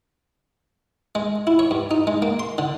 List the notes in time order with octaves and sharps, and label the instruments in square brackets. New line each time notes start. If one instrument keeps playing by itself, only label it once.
[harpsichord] G#3
E4
C#5
G2
D#4
G#3
A#3
C6
D3